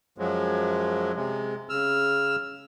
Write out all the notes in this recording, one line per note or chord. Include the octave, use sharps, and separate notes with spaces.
F#2 F3 F#3 G#3
C3 G#3
C#3 E6 F6